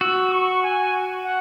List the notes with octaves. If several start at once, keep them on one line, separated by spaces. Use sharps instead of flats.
F#4 E6
C#6
G#5
F#5